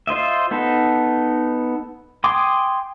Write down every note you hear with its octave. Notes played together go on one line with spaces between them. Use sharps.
F4 C5 D#5 E5
B3 D#4 A4
G5 G#5 C6 D6 D#6